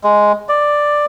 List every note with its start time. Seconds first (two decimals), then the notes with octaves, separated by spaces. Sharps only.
0.04 G#3
0.49 D5